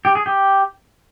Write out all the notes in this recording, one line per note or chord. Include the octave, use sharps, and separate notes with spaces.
G4
G#4
G4